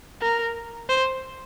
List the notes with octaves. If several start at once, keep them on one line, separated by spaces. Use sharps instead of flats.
A#4
C5